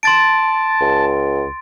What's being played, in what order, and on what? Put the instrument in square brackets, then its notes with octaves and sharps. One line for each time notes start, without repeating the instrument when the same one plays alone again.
[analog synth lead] A5 [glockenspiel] C6 A6 D7
[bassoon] C#2